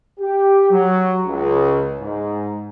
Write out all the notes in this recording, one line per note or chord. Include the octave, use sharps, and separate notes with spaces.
G4
F#3
C#2
G#2